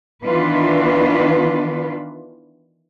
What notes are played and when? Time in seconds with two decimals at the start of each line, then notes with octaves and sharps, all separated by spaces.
0.24 D#3 E3 B3 D4 F4 B4